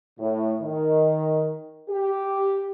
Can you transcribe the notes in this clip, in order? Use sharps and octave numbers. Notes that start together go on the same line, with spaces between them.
A2
D#3
G4